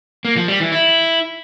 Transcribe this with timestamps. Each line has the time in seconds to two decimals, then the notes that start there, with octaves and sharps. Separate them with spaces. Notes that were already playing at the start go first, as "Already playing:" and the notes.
0.25 A#3
0.36 F3
0.48 G3
0.60 E3
0.72 E4